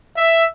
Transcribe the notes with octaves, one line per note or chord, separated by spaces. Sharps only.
E5